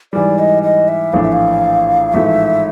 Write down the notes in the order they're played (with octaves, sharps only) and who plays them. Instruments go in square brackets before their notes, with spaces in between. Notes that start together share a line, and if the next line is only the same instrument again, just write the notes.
[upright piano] G#2 E3 G3 [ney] D5
[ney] D#5
D#5
E5
[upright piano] A#1 A2 E3 A3 D4 [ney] F5
[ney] E5
F5
[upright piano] A1 G#2 F3 A3 [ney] E5